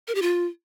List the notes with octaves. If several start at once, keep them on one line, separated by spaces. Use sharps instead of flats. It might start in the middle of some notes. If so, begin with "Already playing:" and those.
A#4
G4
F4